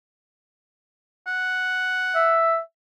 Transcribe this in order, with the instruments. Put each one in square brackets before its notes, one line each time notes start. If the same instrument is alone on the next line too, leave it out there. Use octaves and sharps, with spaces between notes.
[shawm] F#5
[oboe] E5